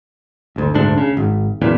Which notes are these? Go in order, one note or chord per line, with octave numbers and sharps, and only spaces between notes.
G1 D2
D#1 D2 G#2 D4
C#3
G#1
F#1 E2 A#2 E3